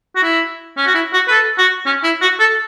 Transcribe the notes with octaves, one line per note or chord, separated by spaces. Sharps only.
F#4
E4
C#4
F#4
E4
F#4
B4
A4
F#4
C#4
E4
F#4
A4